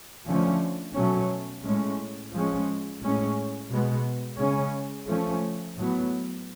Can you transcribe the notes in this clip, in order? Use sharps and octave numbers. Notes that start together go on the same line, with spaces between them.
D3 F3 A3 C#4
B2 F#3 A3 C#4
A2 G#3 C#4
F3 G#3 C#4
A2 G#3 C#4
B2 G#3 B3
C#3 G#3 C#4
F3 A3 C#4
A2 F#3 B3